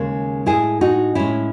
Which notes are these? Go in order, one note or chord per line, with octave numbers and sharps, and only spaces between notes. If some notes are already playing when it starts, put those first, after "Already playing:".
Already playing: D#2 C#3 G#3
A2 G#3 E4 G#4
D#4 F#4
A2 G#3 C#4 E4